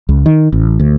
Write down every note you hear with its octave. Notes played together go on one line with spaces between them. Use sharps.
C#2
D#3
A1
D2